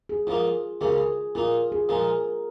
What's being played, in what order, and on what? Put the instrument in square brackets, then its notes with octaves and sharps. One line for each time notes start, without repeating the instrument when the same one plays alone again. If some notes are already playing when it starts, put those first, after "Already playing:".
[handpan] G#4
[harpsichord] G#2 F3 A#3 D#4 [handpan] F4
[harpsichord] C#2 C#3 A#3 C#4 [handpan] G#4
[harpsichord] A#2 A#3 D#4 [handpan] F4
[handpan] G#4
[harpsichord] A#2 F3 G#3 D#4 [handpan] A#4